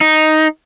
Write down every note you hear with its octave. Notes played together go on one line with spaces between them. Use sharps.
D#4